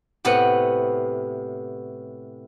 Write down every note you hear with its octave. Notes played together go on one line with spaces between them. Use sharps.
A2 C3 B3 F#5